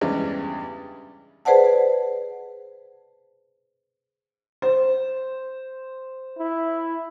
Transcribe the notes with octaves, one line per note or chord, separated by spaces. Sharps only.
E2 G2 C#3 G3 G#3
G#4 B4 C5 D5 F#5 A5
C5
E4